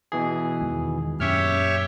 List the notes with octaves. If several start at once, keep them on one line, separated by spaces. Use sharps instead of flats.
B2 E3 G#4
E2 D#3 G#3
F#2 A#2 C#4 G4 C#5 E5 F6